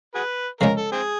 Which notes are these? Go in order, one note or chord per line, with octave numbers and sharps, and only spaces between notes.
F#4 G#4 B4
C#3 F3 G#3 C#4 A#4
A4
C4 G#4